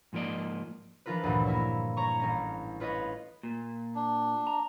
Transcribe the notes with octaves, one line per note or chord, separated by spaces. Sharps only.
G#2 F3 A#3 D5 D#5
E3 F3 D4 F4 A#4 B4
D2 G2 A#2 E3
A#3 E4 C#5
C#5 A#5 C#6
A1 C#4 A#6
F4 B4 C#5 D#5
A#2
D4
A#5